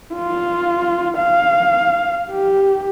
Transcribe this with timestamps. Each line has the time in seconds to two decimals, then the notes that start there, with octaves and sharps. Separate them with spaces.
0.15 F4
1.18 F5
2.32 G4